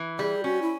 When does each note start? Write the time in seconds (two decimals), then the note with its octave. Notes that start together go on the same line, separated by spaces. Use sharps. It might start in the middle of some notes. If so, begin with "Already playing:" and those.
Already playing: E3
0.19 G3 G#4
0.44 C#4 F#4
0.62 E4